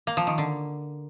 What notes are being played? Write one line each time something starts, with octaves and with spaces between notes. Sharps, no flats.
A#3
F3
D#3
D3